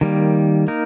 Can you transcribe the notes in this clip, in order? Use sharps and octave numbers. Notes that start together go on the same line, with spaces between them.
D#3 G3 A#3
A#3 D#4 A#4